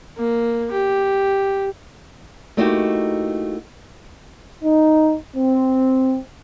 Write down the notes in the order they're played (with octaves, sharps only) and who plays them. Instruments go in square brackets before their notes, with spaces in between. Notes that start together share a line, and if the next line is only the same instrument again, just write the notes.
[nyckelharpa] A#3
G4
[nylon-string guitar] A3 A#3 D#4 E4 F#4 G4
[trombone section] D#4
C4